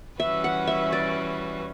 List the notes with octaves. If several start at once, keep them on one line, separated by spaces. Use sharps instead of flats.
E3 G3 C#4 F#4 B4 E5
F#5
E5
D5